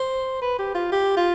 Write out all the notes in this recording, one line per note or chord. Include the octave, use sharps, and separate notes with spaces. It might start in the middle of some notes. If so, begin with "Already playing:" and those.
Already playing: C5
B4
G4
F4
G4
F4